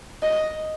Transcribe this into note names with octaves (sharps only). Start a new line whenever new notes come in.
D#5